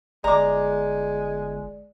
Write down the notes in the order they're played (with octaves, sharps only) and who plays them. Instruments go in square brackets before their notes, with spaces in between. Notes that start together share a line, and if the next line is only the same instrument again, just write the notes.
[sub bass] G1 [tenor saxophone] G#3 [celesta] D5 [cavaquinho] A#5 D6